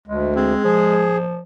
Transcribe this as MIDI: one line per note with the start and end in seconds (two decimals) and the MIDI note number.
0.08 0.54 38
0.08 0.35 56
0.36 1.07 56
0.36 0.60 60
0.64 1.39 53
0.64 1.17 68